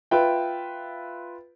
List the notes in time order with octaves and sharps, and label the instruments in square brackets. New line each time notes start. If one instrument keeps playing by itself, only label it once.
[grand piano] F4 B4 E5 G5